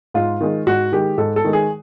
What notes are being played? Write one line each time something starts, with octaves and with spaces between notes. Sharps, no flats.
G#2 F4
D#3 G#3
G#2 F#4
D#3 G#3 G4
G#2 A4
A4
D#3 G#3
G#4